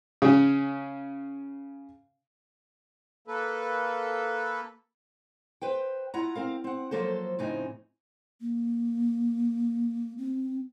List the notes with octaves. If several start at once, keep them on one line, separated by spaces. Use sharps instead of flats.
C#3 C#4
A#3 A4 B4
B4 C5 G5
E4 F4 F#5 A#5
C4 A#4 F5
C4 F#5
F3 F#3 A#3 A4 C5
F2 A2 C#3 C4 D#4 G#5
A#3
C4